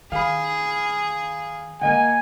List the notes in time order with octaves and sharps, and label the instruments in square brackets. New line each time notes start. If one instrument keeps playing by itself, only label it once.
[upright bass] D#3 [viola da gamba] G#4 [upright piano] F5 B5
[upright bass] D3 G#3 [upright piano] A#3 D#5 F#5 [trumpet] G#5